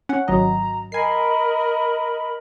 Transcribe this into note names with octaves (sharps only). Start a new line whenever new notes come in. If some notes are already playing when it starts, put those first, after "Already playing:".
C#4 F#5
G#1 F#3 D#5 A#5
A#4 D#5 G#5 B5 C7